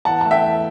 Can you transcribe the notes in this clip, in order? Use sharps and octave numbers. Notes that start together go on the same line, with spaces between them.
E2 F#5 A5
A3 A5
E5 G5
E2